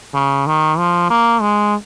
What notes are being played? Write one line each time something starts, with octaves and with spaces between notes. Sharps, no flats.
C#3
D#3
F3
A#3
G#3